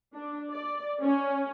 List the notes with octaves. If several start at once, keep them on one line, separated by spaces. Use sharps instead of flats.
D4
D5
C#4